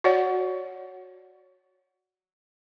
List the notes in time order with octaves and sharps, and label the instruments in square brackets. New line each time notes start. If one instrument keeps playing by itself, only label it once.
[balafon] F#4 C#5 D5 F#5